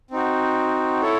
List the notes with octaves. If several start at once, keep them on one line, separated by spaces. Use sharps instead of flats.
C4 D#4 F#4
E4 A4 C#5